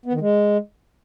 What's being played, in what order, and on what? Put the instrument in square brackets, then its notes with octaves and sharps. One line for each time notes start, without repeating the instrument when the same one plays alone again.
[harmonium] B3
D#3
G#3